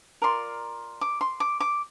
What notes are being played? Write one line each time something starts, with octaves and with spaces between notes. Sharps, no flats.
F4 A#4 D5 C6
D6
C6
D6
D6